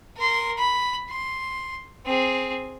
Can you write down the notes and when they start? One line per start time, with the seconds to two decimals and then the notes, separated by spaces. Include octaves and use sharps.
0.17 A#4 C6
0.58 B5
1.09 C6
2.06 C4 G#4